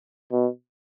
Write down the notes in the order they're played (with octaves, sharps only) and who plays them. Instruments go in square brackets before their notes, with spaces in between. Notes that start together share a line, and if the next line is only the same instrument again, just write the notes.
[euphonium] B2